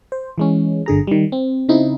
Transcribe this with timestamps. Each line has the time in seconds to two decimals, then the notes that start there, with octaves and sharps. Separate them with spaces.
0.12 C5
0.38 E3 G#3 C#4
0.86 G1 D3 G#4 A#5
1.07 D#3 G3
1.32 C4
1.69 C#3 C4 D#4 E4